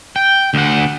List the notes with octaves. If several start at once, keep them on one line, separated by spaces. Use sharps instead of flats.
G5
D2 F#5